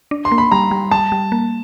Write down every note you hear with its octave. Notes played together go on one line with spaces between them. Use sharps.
D4
C6
A#3
B5
G3 A#5
G3
G3 A5
G3
A#3